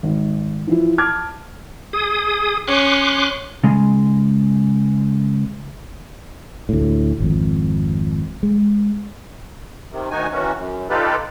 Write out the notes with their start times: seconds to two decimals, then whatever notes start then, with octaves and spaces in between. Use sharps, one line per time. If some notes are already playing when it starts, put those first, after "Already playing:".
0.03 G#1
0.67 E3 F3 E4
0.98 A5 D6 F6 G#6
1.93 G#4 D#6
2.67 C#4 C6 D6 F#6
3.64 C#3 G#3
6.69 D2 A2
7.20 G#1 F2
8.43 G#3
9.91 C3 D#3
10.11 D2 D#3 D#4 F#4 G#5
10.32 D#3 E3 C#4 F#4
10.55 F#2
10.90 D#4 F4 G4 A4 B4 D5